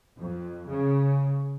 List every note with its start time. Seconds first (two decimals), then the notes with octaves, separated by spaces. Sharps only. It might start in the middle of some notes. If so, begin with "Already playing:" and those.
0.17 F2
0.69 C#3